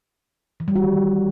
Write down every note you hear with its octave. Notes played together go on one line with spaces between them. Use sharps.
E3
G3
F#4
D#3